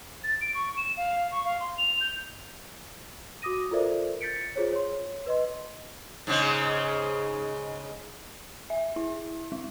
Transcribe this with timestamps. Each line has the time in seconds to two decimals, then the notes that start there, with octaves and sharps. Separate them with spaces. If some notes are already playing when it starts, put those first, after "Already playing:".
0.24 A6
0.41 D7
0.55 C#6
0.77 E7
0.97 F5
1.32 C#6
1.45 F5
1.60 C6
1.78 F7
2.01 G6
3.42 F#4 D6 D#6 A#6 D#7
3.71 F4 A4 A#4 C5 D5 E5
4.21 G6 A6 B6 C#7 D7
4.56 F4 G#4 C5 C#5
4.73 C#5 C6
5.27 B4 D#5 C6
6.27 G#2 C#3 G#3
8.70 E5
8.96 E4
9.52 G#3